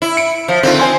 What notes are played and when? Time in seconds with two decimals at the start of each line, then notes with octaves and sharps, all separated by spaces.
0.02 E4
0.17 C#7 D7
0.48 F3
0.63 D3 D#3 C4 F4
0.80 C5 G#5 C6